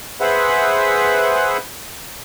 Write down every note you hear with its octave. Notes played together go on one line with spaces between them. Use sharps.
G#4 B4 C5 E5 F#5 B5